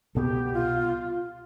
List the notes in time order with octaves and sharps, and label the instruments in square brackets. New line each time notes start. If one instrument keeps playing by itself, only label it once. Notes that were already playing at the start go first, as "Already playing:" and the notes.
[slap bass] C2 B2 B3 [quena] G4 A4
[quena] F4